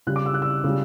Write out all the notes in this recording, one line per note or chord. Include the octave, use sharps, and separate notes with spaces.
C#3 G3 F#6
D6
E6
F#6
E6
C#3 G3